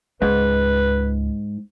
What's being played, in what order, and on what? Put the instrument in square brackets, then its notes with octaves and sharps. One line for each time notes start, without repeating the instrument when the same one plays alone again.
[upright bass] C#2 [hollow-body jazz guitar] G#2 [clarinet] B4